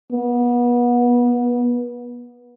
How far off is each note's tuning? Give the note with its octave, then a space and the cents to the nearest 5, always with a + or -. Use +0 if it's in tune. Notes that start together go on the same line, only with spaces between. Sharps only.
B3 -30